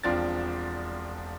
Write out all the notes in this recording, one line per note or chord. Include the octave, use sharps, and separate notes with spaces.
E1 F3 C4 D4 A6